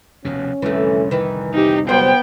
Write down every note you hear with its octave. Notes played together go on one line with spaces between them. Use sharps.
F1 D#2 B2 C#4
C2 F2 D3 E3 A3
D#3 E3 B4
C3 D#4 G4
F#3 G3 B3 C5 G5